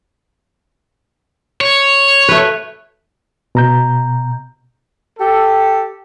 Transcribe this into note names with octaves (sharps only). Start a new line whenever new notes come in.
C#5
A3 B4
B2 A#5 G6
G4 A4